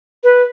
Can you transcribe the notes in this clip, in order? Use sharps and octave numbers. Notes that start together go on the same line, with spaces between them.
B4